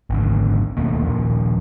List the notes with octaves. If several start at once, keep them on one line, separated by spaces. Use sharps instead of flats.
G#1 D2
D#2 B2 A3 A#3
D#1 A#2 F3